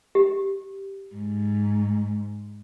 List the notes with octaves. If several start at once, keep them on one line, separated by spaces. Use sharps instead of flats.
G4
G#2